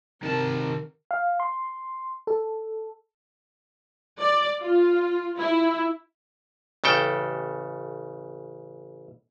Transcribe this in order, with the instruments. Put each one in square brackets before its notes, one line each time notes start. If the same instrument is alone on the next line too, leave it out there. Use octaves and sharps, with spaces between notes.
[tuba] C3 [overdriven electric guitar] D#3 A5 [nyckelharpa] A#4
[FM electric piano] F5
C6
A4
[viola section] D5
F4
E4
[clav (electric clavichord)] A1 C#3 A4 G5